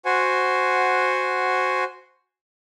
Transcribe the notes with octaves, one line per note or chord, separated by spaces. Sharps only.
F#4 C5 F#5 G#5